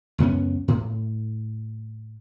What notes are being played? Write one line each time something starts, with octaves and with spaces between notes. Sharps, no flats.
C#2 F#2 B3 C#4
A2